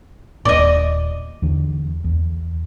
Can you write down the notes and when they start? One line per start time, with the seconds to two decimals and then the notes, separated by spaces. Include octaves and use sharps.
0.45 D#1 A#2 D5 D#5
1.42 E2 D3
2.04 E2